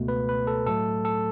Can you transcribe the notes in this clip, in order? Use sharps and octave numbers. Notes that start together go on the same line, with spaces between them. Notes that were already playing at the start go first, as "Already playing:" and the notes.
Already playing: C#2 B2 A3
B4
B4
A4
A2 F#3 A3 A4
A4